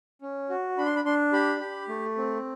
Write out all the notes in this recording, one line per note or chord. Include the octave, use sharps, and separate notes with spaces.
C#4
F#4
D4 B5
C6
B5
D4 C6
G4 B5
G4
A3
C4